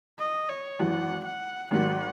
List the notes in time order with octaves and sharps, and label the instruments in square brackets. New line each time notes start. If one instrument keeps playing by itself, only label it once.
[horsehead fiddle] D#5
C#5
[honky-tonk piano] G#1 F#2 E3 [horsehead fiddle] F#5
[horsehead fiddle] F#5
[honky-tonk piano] G#1 G#2 D#3 F#3 [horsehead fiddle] F#5